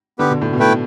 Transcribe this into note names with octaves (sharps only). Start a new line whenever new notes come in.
D3 B3 G4 B4
B2
A2
B2
A3 E4 B4 G5